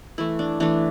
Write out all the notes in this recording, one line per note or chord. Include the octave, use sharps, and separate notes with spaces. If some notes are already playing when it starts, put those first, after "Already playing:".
E3 A3 E4
D4
E3 A3 D4